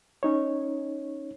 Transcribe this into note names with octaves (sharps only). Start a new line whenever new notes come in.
C#4 D#4 C#5